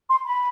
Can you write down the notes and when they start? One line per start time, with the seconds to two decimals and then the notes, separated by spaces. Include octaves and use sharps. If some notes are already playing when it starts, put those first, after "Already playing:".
0.09 C6
0.25 B5